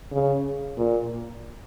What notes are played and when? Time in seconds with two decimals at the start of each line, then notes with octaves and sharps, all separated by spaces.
0.12 C#3
0.77 A#2